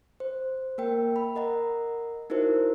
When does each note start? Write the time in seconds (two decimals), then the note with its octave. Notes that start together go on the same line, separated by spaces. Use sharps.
0.20 C5
0.78 A#3 A#4 G5
1.16 B5
1.36 A#4 D#5 F#5 A#5
2.30 D#4 E4 F#4 A#4 C5